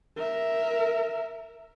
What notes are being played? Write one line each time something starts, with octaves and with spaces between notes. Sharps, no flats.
A#4 E5